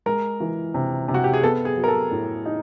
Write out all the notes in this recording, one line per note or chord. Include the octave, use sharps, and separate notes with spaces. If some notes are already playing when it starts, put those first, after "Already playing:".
G#3 A#4
E3
C3
C3
F#4
G4
G#4
B3 A4
G#4
F#3
A#4
A4
A2
D#4